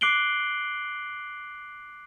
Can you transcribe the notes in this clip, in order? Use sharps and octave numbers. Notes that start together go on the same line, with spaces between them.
D6 F#6 C7 D7 F#7 G7